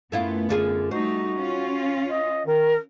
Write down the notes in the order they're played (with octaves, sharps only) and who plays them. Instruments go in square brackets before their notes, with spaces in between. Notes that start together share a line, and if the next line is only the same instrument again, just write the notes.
[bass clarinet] F#2 [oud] A3 E4 F4 [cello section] B3
[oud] D3 F4 G#4
[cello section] G3 A3 D#4 [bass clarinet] F#4 [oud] C5
[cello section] C#4 F4
[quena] D#5
[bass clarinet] D#3 [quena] A#4